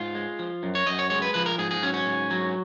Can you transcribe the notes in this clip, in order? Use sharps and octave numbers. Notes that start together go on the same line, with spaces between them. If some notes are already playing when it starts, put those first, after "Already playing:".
Already playing: G#2 F4
G#3
F3
F#2
C#5
F#2 D#5
C#5
G#3 C#5
B4
F3 B4
A#4
G#2 G#4
G#4
F#3 C#4
C#4
G#2
F#3